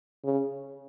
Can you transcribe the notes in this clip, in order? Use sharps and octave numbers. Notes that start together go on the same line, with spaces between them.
C#3